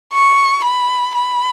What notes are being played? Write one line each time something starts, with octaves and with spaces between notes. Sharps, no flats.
C#6
B5
B5